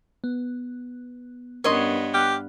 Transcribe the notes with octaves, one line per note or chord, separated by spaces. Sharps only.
B3
G2 B3 C#4 D4 A#4 C#5 D#5 C6
G4 F6 F#6